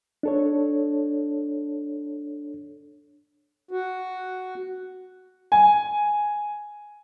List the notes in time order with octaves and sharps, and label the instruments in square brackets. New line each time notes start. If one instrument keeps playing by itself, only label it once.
[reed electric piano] D4 A4 C#5
[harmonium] F#4
[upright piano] G#5